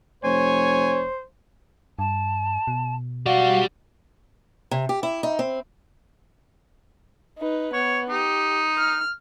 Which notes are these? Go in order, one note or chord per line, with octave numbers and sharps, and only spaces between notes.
F1 C5 C#5 G#5
G2 A5
B2
G3 F#4 D5 F5
C3
G4
E4
D#4
C4
D#4 B4
B3 C#5
D#4 G4
F6